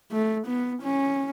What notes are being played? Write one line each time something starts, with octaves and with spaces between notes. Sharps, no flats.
A3
B3
C#4